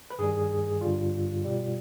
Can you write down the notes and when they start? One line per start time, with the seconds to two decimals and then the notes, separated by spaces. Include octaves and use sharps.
0.10 B4
0.19 G2 D#3 G3 G#4
0.81 G2 D3 G3 F4
1.44 B2 G3